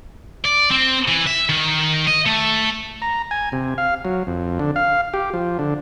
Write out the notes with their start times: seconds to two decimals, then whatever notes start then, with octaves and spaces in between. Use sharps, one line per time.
0.45 D5
0.71 C4
1.08 E3
1.27 E5
1.49 D#3
2.07 D#5
2.26 A3
3.02 A#5
3.31 G#5
3.52 C3
3.78 F5
4.05 F#3
4.27 F2
4.59 D3
4.76 F5
5.14 G4
5.34 F3
5.59 D3